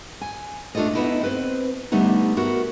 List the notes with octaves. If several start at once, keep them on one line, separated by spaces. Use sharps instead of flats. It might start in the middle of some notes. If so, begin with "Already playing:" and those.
G#5
A3 D4 F4 A4 D5 D#5
B3 D#4 E4 A4 D#5
C4 B4 C5
D3 G3 A3 B3 D#4
B3 F#4 A#4 E5